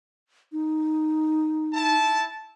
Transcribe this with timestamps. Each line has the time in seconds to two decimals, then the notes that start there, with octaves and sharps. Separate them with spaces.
0.52 D#4
1.74 E4 A5